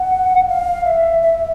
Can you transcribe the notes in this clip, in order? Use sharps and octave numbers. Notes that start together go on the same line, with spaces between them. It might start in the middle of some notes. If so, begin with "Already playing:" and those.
Already playing: F#5
F5
E5
E5